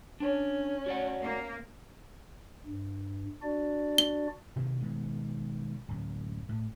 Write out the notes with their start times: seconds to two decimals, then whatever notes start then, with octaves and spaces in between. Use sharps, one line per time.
0.20 C#4 D4
0.86 F#4 D5 F#5
1.20 A#3
2.66 G2
3.42 D4 F#4 D5
3.98 G7
4.56 B2 D#3 A#3 C4
4.80 B2 D#3 G#3 B3
5.88 D1 F#2
6.49 A2